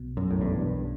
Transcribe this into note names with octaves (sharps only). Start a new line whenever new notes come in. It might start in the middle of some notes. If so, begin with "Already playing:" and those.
Already playing: B1 B2
B1 F#2
A2
E2 G2
B1